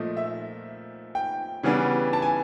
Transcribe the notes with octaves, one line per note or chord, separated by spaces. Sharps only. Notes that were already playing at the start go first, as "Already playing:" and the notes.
Already playing: A#2 F3 A3 D#5
E5
G5
C#3 E3 G3 B3 D4
A5
G#5